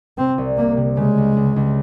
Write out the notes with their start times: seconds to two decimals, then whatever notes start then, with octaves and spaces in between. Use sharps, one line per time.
0.18 C3 C4
0.38 C2
0.57 C3 A#3
0.77 C3
0.97 C#3 G#3
1.18 C#2
1.37 C#2
1.56 C#2